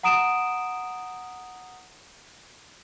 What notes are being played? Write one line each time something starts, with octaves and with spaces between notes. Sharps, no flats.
F#5 A#5 D#6 D7 E7